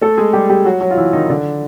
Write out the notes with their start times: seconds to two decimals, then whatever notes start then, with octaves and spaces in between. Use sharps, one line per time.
0.01 A3 A4
0.17 G#3 G#4
0.33 G3 G4
0.50 G3 G4
0.65 F#3 F#4
0.81 F#3 F#4
0.91 F4
0.97 E3 E4
1.13 D#3 D#4
1.30 D3 D4